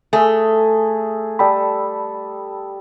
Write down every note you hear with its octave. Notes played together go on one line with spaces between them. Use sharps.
A3 G#4 E5
G3 A4 D5 G5 B5 D#6